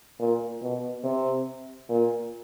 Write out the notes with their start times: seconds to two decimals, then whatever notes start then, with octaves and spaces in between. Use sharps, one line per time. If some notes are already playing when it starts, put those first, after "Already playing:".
0.19 A#2
0.62 B2
1.04 C3
1.89 A#2